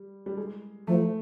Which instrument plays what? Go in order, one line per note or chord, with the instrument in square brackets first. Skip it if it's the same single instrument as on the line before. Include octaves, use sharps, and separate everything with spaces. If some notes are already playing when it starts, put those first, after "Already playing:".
Already playing: [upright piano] G3
G3
G#3
[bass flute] F3 [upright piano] A3